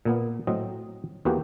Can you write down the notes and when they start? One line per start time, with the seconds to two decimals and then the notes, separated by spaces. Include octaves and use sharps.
0.05 A#2 A#3 B3
0.47 A2 F#3 C4 D#5
1.25 E2 E3 A#3 F#4 G4